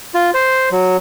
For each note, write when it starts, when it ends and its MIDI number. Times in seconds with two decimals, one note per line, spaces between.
0.14 0.31 65
0.34 0.69 72
0.71 0.97 54